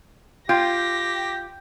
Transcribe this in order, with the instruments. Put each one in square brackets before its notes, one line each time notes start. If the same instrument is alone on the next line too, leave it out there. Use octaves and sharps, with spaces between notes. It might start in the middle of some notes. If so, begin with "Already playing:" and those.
[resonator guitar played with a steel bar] F4 [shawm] G4 [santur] G5 [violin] A#6